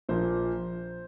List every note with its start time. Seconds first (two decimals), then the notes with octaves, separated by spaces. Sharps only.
0.09 A#1 A#2 F3 A#3 C5